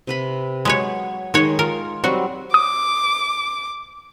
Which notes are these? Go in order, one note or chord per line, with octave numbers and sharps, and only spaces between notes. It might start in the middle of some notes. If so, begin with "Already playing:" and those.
C3 B4 B5
F#3 G#3 B4 C#5
D#3 G#3 F#4 C#5
F4 A#4
F#3 G3 C4 F#4
D6 D#6